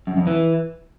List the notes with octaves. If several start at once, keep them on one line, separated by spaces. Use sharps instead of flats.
F#2
F2
E3